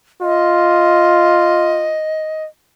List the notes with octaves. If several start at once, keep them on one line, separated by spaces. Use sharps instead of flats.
F4 D#5